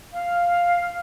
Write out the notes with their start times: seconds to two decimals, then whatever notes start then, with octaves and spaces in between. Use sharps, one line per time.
0.13 F5